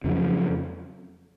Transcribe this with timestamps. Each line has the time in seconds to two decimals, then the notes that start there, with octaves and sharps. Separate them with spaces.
0.04 F2 C#3 F#3